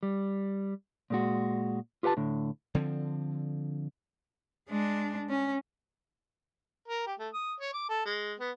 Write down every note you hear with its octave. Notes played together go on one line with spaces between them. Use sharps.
G3
A#2 G#3 F#4
F4 G4 B4 F#5 A5
A2 D3
D3 F3 C4
G#3 D4
C#4
A#4
G4
A3
D#6
C#5
D6
A4
G#3
B3